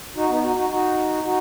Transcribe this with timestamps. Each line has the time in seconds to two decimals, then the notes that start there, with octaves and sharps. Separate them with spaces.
0.16 D#4 F#4
0.29 B3 D#4
0.43 D#4 F#4
0.56 D#4 F#4
0.69 D#4 F#4
1.23 D#4 F#4